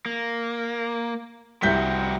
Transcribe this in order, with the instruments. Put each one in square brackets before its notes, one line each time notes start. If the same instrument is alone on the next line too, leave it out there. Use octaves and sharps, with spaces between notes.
[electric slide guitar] A#3
[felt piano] C2 G6 B6 [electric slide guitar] G3 F#4 C5